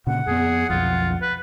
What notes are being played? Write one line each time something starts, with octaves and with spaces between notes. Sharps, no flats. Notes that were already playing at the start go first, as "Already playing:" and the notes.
A#2 C#3 F#5
F2 B3 G#4
B1 F2 F4
B4